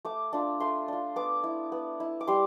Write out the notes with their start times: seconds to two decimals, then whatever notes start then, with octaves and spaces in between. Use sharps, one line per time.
0.05 A3 D6
0.33 D4 F4
0.60 A3 C6
0.88 D4 F4
1.16 B3 D6
1.44 E4
1.72 B3
2.00 E4
2.21 D6
2.27 G3 C6